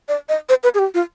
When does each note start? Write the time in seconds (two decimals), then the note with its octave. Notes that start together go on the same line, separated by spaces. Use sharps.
0.09 D5
0.29 D#5
0.49 C5
0.64 B4
0.74 G#4
0.79 G4
0.94 F4